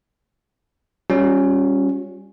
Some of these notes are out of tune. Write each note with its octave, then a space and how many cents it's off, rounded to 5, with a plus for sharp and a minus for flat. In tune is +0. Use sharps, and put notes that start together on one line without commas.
G3 +5 C#4 -5 F4 +45